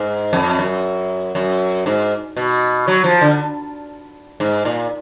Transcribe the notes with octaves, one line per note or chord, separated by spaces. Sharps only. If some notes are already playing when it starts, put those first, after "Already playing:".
Already playing: G#2
F2
F#2
F#2
G#2
B2
F#3
F3
D3
G#2
A#2